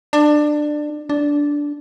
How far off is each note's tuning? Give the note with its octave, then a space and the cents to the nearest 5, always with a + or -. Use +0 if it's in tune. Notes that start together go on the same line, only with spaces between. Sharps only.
D4 +20
D4 -10